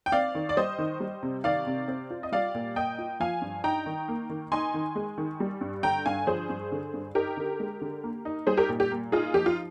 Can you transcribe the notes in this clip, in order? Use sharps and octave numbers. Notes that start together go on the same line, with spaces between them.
G5
C4 D5 F5
D#3
D5
G3 C5 D#5
D#3
G3
C3
D#3 D5 F5
C3
C4
F4
D#5
G3 D5 F5
A#2
A#3 D#5 G5
F4
F3 F5 G#5
G2
D#4 G5 A#5
D#3
A#3
D#3
D#4 G#5 C6
D#3
G#3
D#3
G3
G2
D3 G5 A#5
G2 F5 G#5
F3 G#4 C5
G2
D3
G2
D#4 G4 A#4
D3
G#3
D3
A#3
D#4
G3 G#4 C5
G4 A#4
A#2
G4
A#3
D#4 F4 G#4
F3 G4
F4